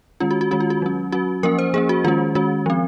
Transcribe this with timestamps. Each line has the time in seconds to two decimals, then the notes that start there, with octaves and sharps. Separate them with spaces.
0.20 D#3 G#3 C#4 F4
0.31 F#4
0.41 F#4
0.51 D#3 G#3 C#4 F#4
0.60 F4
0.70 F#4
0.82 F#3 C#4
1.12 F#3 C#4 F#4
1.43 F3 A#3 C#4 A#4
1.59 C5
1.74 F3 A#3 C#4 G#4
1.89 F#4
2.04 D#3 G#3 C#4 F4
2.35 D#3 G#3 C#4 F#4
2.66 F3 C4